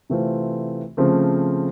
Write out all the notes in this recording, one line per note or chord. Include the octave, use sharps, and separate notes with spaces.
C3 E3 A3 C4 F4
C#3 F3 A3 C4